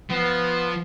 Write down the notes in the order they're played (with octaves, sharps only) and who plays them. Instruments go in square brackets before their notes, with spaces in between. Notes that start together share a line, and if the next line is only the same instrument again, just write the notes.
[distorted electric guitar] F3 [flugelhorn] B3